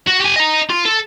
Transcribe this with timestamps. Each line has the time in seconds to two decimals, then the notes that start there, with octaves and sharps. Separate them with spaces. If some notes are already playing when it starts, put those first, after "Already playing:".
0.07 F#4
0.20 G4 G#5
0.36 D#5 A#5
0.70 F4
0.85 A4